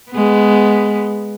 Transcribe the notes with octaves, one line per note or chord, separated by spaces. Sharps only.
G#3 B3